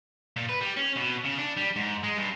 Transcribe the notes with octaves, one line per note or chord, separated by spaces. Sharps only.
A#2
B4
G3
C#4
B2
C#3
D4
G3
G#2
G#3
G2